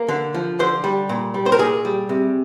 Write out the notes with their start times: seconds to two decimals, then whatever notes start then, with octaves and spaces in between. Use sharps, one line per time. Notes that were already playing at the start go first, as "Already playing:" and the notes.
Already playing: A#3 A#4
0.08 D3
0.34 F3
0.59 D3 C5
0.84 G3
1.09 A#2
1.34 G3
1.46 C5
1.52 A#4
1.59 A#2 G#4
1.85 G3
2.09 C3